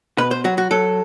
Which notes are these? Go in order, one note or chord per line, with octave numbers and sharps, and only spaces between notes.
B2 B4
C5
F#3 F#4
F#4
F#3 A4